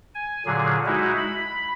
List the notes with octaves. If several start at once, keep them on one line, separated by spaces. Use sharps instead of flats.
G#5
A#2 D3 F#3 G#4
G#3 D#4 E4 F#4
B5